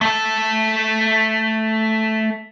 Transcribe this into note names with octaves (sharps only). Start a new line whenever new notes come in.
A3 A4